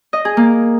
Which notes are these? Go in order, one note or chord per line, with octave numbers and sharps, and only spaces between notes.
D#5
G#4
A#3